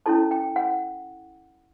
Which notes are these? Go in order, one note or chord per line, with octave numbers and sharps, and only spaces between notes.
C#4 E4 A4 A5
G5
F#5